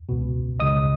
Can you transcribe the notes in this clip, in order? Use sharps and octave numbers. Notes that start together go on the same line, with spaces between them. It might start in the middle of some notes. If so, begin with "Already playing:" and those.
C#2 B2
C#2 C#3 D#5 D#6